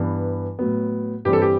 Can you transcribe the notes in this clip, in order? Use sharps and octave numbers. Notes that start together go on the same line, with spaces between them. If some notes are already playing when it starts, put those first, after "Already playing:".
Already playing: G2 E3 B3
A2 F#3 B3
G2 E3 G3 C4 G4
A4
G4